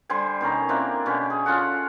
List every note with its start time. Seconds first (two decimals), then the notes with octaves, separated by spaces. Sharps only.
0.10 D3 G3 C5 G#5
0.41 B2 D#3 C#4 A#5
0.69 A#3 C4 D4 E4
1.06 B2 D3 C#4 G4
1.30 G#4
1.46 C#4 F4 A4 F#5